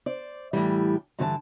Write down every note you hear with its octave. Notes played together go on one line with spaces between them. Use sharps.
C5 D5
A2 E3 G3
G2 D3 E3 B4 A5